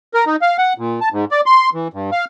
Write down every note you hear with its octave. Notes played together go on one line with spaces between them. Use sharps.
A#4
D#4
F5
F#5
A#2
A5
G#2
D5
C6
E3
G2
F5